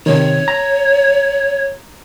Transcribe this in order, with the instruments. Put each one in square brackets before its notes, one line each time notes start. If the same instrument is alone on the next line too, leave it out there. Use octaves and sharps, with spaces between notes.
[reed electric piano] C3 D#3 [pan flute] C#5
[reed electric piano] A#5